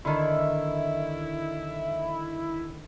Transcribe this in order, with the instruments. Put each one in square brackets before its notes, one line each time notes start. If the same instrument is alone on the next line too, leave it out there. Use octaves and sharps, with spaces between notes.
[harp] D3 D#3 [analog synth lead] E4